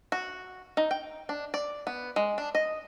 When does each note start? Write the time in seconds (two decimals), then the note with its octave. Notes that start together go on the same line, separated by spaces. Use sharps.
0.12 F#4
0.77 D#4
0.91 G5
1.29 D4
1.54 D5
1.87 B3
2.16 G#3
2.38 D4
2.55 D#5